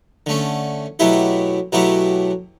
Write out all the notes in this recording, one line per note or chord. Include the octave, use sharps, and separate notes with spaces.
D3 A3 C#4
B2 F#3 A3 E4 G4
B2 F#3 A3 E4 G4